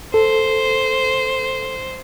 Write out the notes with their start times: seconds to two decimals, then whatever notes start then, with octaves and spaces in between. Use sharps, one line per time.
0.14 A4 C5